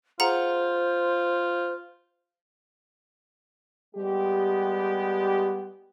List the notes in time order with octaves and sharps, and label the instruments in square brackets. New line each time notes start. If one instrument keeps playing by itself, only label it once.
[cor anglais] F4 [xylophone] G#4 F#5 A#5 [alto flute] C5
[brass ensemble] G3 G#3 B3 G4